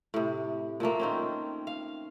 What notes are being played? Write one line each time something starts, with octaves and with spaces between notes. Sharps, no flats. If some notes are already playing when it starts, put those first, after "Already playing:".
A2 C3
A#2 F3 A3 A#3
D#3 C4 C#4
F5